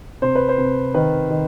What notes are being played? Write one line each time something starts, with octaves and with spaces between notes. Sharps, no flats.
C3 C5
B4
C5
C3
D#3 B4
D#3